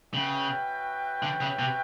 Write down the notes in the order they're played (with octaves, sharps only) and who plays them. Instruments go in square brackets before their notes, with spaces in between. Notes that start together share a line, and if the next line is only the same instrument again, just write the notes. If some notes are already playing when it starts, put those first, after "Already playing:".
[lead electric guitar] C#3 [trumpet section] C#4 F#4 B4 E5 G5
[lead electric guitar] D3
C#3
C3